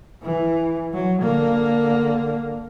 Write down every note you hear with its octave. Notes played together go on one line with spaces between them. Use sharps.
E3
F#3
D3 A#3